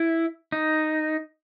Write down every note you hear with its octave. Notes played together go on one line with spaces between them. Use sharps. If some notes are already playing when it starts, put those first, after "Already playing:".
Already playing: E4
D#4